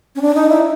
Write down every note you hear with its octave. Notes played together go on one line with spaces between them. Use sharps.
C#4
D4
D#4
E4